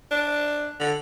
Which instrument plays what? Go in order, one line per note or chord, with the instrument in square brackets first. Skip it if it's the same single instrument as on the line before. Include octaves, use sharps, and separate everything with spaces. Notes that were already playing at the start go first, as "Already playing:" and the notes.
[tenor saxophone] D4
D3